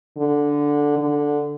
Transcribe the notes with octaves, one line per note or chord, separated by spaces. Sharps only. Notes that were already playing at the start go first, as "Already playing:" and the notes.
D3
D3